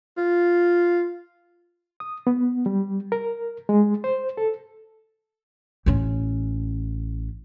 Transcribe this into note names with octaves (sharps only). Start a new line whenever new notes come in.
F4
D#6
B3
G3
A#4
G#3
C5
A4
A1 C#4